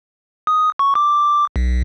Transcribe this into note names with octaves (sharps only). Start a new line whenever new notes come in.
D#6
C#6
D6
B1